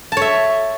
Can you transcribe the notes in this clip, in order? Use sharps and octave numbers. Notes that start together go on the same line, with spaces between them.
C#5 E5 A5